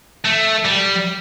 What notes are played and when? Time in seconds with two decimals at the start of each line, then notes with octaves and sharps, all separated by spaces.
0.25 A3
0.65 G3